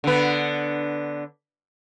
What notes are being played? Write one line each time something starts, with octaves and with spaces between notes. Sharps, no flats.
D3 B3